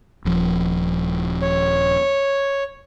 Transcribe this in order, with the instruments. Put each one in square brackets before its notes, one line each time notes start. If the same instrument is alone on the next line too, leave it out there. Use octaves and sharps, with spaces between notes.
[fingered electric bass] D#1 F3
[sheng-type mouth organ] C#5